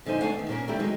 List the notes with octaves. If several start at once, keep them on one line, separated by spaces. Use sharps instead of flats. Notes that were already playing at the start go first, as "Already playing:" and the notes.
A#2 D3 F3 D#4 C5 G#5
A3 D4 F#5 G#5
E2 D#3
A#2 A#3 C#4 A#4
D#3 A3 D4 E4 G4
D3 D#3 F#3 G#3 D#4